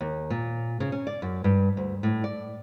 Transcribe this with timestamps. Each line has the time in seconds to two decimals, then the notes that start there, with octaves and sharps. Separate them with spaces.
0.01 D#2
0.30 A#2
0.80 C#3
0.92 C#4
1.07 D5
1.22 F#2
1.44 G2
1.77 D2
2.03 A2
2.24 D5